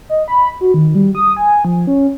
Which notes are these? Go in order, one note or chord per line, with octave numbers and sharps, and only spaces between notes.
D#5
B5
F#4
D#3
G3
D#6
G#5
F3
C#4